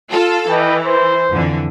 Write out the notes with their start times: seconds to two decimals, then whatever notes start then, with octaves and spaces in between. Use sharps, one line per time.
0.11 F4 A4
0.49 E3 B4 D#5 G5
0.85 C5
1.32 F2 D3 E3